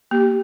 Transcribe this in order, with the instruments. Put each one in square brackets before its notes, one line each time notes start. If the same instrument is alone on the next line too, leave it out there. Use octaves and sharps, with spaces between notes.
[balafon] A#3 [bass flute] G4